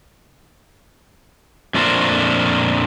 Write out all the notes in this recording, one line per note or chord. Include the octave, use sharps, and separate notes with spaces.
F2 A#2 A3 D4 A#4 C5